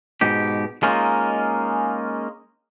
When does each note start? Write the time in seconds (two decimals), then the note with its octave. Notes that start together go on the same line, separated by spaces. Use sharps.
0.21 G#2 B2 G4
0.83 G#3 A#3 C#4 D#4 F4